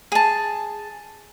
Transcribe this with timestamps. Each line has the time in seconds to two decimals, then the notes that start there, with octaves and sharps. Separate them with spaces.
0.12 G#4 A5